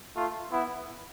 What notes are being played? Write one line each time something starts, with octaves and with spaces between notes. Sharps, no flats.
A3 F4
B3 E4